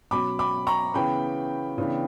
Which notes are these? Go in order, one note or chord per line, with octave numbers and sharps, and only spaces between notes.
B2 F#3 C#4 B5 D6
B5 D6
A#5 C#6
C#3 E3 B3 G5 B5
C#3 E3 B3 D4